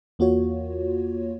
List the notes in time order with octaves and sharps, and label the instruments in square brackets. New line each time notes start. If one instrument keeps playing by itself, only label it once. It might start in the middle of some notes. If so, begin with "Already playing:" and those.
[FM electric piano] E2 A#3 F4 F#4 C#5